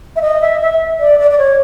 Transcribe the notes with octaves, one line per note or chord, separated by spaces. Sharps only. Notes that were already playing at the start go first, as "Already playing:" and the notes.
E5
D#5
E5
E5
D5
D5
D5
C#5